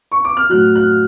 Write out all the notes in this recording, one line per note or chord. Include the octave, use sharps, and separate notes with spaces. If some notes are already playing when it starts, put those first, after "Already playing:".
C#6
D6
F6
A2 F#3 F#6
F#6